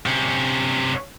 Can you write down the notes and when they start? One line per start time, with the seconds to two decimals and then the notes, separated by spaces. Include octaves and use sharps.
0.06 C3 C#4